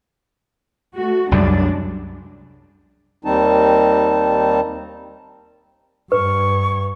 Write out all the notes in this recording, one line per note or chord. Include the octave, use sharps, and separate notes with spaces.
A3 F#4
C2 F#2 G3 G#3 D4
D#2 D#3 G3 C4 D#4 A5
G2 B4 C#6